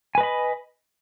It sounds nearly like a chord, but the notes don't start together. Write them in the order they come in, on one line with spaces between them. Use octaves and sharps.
G#5 B4 D#5 B5